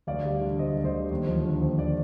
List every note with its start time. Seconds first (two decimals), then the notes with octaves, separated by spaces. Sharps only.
0.07 D2 D5 F5
0.25 G3
0.41 D3
0.59 D2 C5 D#5
0.77 D2
0.85 C5 D#5
0.93 G3
1.11 D#2
1.27 F3
1.45 D3
1.61 D#2 C5
1.79 D5